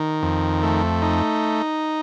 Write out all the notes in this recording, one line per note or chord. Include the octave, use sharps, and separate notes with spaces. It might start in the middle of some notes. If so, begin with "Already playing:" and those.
Already playing: D#3
F2
A3
D#4